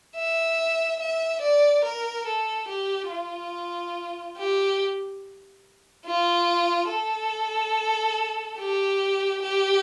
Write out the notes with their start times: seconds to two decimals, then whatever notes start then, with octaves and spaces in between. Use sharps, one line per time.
0.16 E5
1.00 E5
1.42 D5
1.84 A#4
2.27 A4
2.68 G4
3.11 F4
4.38 G4
6.06 F4
6.90 A4
8.59 G4
9.44 G4